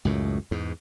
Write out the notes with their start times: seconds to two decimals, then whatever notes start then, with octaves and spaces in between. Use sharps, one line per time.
0.05 C#2 F#2 A2
0.51 E2 G#2